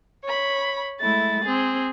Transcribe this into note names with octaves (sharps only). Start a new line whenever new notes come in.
C#5 B5
G#3 A3 E4 A6
C4 G#4